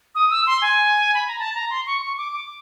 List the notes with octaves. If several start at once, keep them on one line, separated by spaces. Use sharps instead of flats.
D#6
E6
C6
G#5
B5
A#5
A5
A#5
C6
C#6
C#6
D6
D6